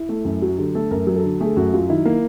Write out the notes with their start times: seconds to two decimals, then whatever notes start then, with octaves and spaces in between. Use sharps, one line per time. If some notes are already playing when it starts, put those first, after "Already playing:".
Already playing: E4
0.09 A3
0.25 F#2
0.42 F#3 F#4
0.58 D3 G4
0.75 A3 A4
0.91 F#2 A#4
1.07 F#3
1.16 A4
1.23 D3
1.40 A3 G#4
1.57 F#2 F#4
1.73 F#3 F4
1.89 D#3 E4
2.05 A#3